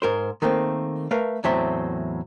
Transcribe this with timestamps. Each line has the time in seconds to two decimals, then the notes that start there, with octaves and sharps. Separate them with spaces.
0.02 G#2 A#4 C5
0.42 D#3 A3 A#3 C4
1.11 A3 A#4 B4 F5
1.44 E2 A2 F#3 C4 E5 C6